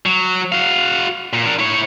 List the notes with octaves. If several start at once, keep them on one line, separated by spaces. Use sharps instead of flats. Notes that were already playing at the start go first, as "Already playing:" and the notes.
F#3
F#4 F5
A#2
D4 A#4
E4 C#5